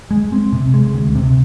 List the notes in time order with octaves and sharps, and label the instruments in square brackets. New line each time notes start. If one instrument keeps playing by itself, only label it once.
[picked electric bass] G#3
C4
C3
G#3
D2
C3